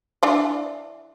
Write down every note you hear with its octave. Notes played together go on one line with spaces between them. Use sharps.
E3 D4 D5